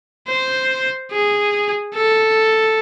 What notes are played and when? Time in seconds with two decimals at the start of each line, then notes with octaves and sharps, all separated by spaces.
0.28 C5
1.12 G#4
1.94 A4